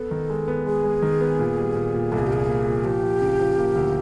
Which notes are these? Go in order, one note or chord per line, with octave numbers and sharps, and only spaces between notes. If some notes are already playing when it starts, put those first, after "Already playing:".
Already playing: B3 A4
D#3
G#3
B3
G#3 G#4
G#3
D#3
B3
A#2
G3
A#2
A#2
C2 A4
G#4
G4
A#2 G#4
A#3
A#2
F3 G4
F3
C#3
F3
A#3
D2